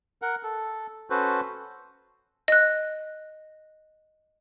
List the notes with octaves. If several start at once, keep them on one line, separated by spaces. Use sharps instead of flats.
A#4 F#5
A4
C#4 F#4 A4 B4 C5
D#5 F#6